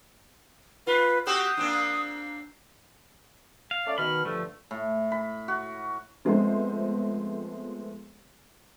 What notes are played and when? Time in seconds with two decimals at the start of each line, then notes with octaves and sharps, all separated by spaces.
0.87 F4 B4
1.27 C4 F#4 G4 D#6
1.57 A#3 C4 D4
3.71 F5
3.86 A3 C#4 D5
3.98 B2 D#3 B5 F6
4.25 G2 D3 F3 A3
4.71 A2
5.12 B5
5.48 F#4
6.25 F3 G#3 A3 B3 C4 C5